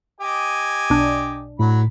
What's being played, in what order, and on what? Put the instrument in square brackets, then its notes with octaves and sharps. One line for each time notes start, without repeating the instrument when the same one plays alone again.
[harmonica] G4 D#5 G#5
[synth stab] B1 D4
[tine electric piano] A2 [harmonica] F#3 B5